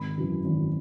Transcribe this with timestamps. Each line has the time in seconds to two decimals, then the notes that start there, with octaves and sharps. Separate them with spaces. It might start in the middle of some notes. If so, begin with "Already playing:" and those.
Already playing: G#1 B5
0.17 F#2 C#3 E3
0.45 G#1